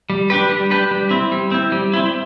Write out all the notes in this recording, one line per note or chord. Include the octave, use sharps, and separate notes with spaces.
G3
D4 G4 B4
G3
D4 G4 B4
G3
C4 E4
G3
C4 E4
G3
C4 E4